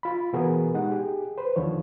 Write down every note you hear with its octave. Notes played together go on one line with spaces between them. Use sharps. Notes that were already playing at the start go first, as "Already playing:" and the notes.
F4 B5
B2 E3 B3 F#4 G#4 A#4
G#3 D#4 G4 F#5
G4 G#4
B4 C5
D#2 D3 D#3 F3 C#5